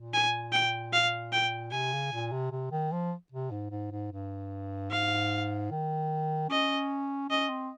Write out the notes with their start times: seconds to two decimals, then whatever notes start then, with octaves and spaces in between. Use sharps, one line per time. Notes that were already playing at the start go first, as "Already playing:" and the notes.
Already playing: A#2
0.14 G#5
0.52 G5
0.93 F5
1.33 G5
1.72 C3 G#5
1.93 C#3
2.12 A#2
2.32 C3
2.52 C3
2.72 D#3
2.92 F3
3.32 C3
3.51 G#2
3.71 G#2
3.91 G#2
4.12 G2
4.90 G#2 F5
5.71 D#3
6.50 C#4 D#5
7.30 C#4 D#5
7.50 C4